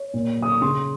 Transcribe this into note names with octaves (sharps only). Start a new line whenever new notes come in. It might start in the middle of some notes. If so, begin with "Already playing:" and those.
Already playing: C#5
A#2
F#3 D#6
C#6
C#3 C6